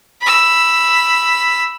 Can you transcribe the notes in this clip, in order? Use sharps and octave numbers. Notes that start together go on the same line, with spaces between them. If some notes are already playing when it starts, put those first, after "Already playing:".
B5 E6